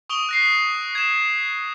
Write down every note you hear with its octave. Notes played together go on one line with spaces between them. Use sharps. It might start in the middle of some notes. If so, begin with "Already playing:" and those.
C#6 D#6 D7 F7 G7
F#6 A#6 C7
G#6 E7